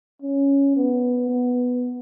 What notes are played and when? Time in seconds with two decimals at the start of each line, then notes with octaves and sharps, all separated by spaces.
0.22 C#4
0.76 B3
1.29 B3